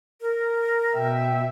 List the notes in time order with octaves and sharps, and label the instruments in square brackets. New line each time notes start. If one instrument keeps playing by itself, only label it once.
[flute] A#4
[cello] B2 E5 [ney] G5